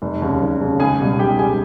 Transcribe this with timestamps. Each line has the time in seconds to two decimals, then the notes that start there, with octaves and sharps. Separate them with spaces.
0.02 F1
0.22 D#2 C#3
0.41 F1
0.61 D#2 C#3
0.80 C#2 G#4 G#5
1.00 B2 G3
1.19 C#2 G4 G5
1.39 B2 G3 G#4 G#5